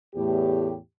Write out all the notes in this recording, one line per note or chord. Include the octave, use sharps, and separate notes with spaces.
E2 A2 G4